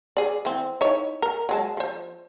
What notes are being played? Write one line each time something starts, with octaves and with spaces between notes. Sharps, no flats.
G#4 D5
E3 C4
D#4 E4 C#5
A#4
F#3 G#3 A5
F3 C5